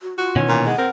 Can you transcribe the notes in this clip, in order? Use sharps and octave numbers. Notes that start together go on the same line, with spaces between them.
F#4
F4 F#4
B2 D#3 E3 C#4
A#2
G#3 F#5
C4 A#4